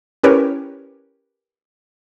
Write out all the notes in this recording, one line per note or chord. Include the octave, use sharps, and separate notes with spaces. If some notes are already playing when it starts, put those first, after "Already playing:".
C#4 E4 G4 A#4 B4 C#5